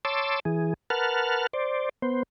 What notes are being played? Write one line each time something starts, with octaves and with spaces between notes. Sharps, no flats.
C#5 A5 C6 D6 E6
E3 G#4
A#4 B4 F#5 A5 F6
C5 D5
B3 C5